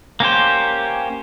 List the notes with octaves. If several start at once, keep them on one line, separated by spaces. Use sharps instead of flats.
A#3 C#4 G4 C5